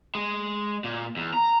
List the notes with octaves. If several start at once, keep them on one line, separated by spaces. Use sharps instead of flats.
G#3
A#2
E2
A#5